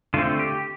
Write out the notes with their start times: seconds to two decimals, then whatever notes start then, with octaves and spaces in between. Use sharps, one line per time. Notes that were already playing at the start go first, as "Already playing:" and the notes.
0.14 D3 A3 C4 F4
0.39 G4